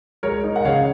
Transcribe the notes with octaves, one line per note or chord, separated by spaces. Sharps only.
G#3 A#4 C#5
D#4
F#5
C#3 C#5 F5